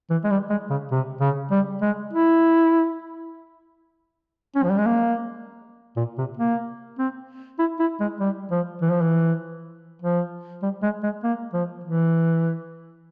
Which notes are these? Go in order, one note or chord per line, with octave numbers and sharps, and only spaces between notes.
E3
G#3
G3
G#3
C#3
C3
C#3
G3
G#3
E4
C#4
F3
G3
G#3
A#3
A#2
C3
A#3
C4
E4
E4
G#3
G3
F3
E3
F3
E3
F3
G3
G#3
G#3
A#3
F3
E3